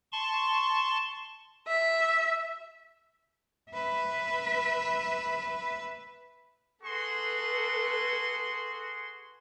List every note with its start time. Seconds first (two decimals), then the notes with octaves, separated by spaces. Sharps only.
0.12 A5 C6 C#6
1.68 E5
3.71 B4 E5
6.84 F#4 G#4 A4 B4 C6